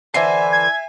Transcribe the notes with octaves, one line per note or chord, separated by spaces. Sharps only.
D3 E3 C5 E5 G#5 C7
G#6